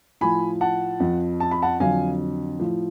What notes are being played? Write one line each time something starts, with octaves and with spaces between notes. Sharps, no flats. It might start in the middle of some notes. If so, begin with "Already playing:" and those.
A2 F3 G#5 B5
F#5 A5
F2 F3
A5
B5
F#5 A5
F2 D3 F#3 F5 G#5
A2 F3